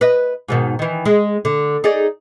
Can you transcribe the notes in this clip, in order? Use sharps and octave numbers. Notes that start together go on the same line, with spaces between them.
B4 D#5
G#2 B2 D#3
D#3 E3
G#3
D3
D#4 G#4 D5